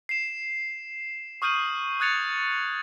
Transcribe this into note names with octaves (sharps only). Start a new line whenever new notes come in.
C7 E7
C#6 D#6 F6 G6 D#7 F#7
D#6 F#6 G#6 A6 C#7 F7